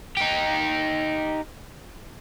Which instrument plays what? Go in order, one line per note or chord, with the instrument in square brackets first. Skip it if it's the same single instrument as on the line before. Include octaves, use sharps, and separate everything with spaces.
[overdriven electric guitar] D#4 G4